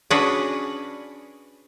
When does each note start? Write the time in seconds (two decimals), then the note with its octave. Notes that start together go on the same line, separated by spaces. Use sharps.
0.10 C#4 D4 F#4 G#4 B4